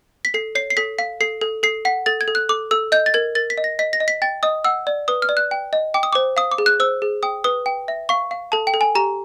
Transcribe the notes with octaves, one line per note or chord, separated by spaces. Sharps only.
B6
A4 C7
C#5 C7
C7
A4 B6
F5 B6
A4 C7
A4
A4 C7
F#5 B6
A4 A6
G#6
A4
F#6
A4 D6
A4 E6
D#5 G6
A6
A#4 G#6
A#4 A6
B6
D#5
A#6
D#5 B6
A#6
D#5
B6
G5 A6
D#5 D#6
F#5 E6
D5
B4 D#6
F6
D5
F#6
G5
D#5
G5 D6
D#6
D6
C5
F5 D#6
D6
G#4
F#6
C5 E6
G#4
G5 D#6
B4 D#6
G5
E5
F5 C#6
F5
A4 A5
G5
A4
G#5
G4 A#5